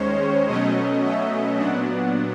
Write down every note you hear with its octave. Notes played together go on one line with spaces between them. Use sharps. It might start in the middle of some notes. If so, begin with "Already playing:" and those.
Already playing: D#2 D#3 G#3 C#4 C5 C#5
B2 F#3 A3 C#4 D#5
E5
A#2 F#3 B3 D4 F#5